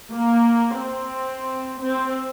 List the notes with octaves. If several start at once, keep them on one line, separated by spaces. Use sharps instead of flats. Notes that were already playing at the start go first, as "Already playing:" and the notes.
A#3
C4
C4